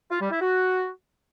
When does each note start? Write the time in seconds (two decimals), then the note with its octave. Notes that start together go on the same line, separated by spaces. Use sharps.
0.10 F4
0.20 G3
0.30 E4
0.40 F#4